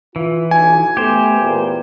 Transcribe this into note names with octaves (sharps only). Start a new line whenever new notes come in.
E3 F4
B1 G#5
A3 B3 G4 C5
E2 A#2 B3